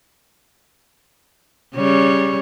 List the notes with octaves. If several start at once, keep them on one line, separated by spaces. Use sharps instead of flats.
C#3 G3 C#5